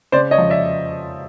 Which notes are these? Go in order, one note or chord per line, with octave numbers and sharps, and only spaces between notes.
C#3 C5 D5
C#5 D#5
F3
D5 E5